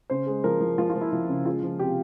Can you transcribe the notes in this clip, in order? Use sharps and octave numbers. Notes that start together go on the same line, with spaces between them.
C#3 C5
G#3
F3 A#4
F3
F3 F4
F4
F3
E4
F3 E4
C#3
G#3 F4
F3
C3 G4